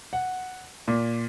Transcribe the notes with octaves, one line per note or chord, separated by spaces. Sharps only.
F#5
A#2